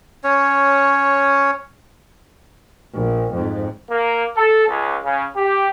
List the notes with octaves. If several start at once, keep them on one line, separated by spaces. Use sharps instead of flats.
C#4 C#5
A#1
F2 G#2
A#3
A4
C#2
C#3
G4